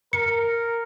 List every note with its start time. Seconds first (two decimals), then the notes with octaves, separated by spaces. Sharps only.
0.13 A#4 C#7